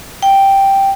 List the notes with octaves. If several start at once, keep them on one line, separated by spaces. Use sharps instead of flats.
G5